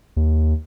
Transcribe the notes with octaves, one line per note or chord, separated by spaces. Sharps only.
D#2